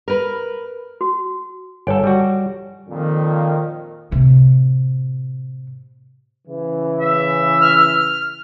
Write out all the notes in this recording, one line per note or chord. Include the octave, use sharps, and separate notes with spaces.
A#4 B4
F#4
G1 A4 C#5 G#5
G3 F#4
F2 A#2 D#3
A2 C3
C#3 E3
E5
F6